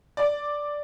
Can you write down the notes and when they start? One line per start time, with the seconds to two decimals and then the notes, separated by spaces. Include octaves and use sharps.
0.17 D5